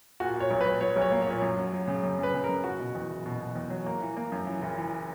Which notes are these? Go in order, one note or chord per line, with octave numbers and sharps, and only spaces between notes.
A#2 F#4
A#2 C#5
B1
B4
F#3
F#3 C#5
B1
C#5
A#3
C#5
A#2
F#2
F#3
F#3
C#3
F#2
F#2 B4
C#3
A#4
F#2
F#1 F#4
B2
E2
F#1
B2
B2
E2
F#3
A#3
E3
A#3
F#2
E3
F#1
E3